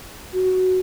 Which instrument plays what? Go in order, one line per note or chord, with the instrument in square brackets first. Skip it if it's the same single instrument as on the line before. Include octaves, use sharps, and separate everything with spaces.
[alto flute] F#4